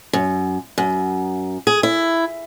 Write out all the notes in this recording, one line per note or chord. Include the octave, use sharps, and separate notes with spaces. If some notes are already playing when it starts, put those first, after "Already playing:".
F#2
F#2
G#4
E4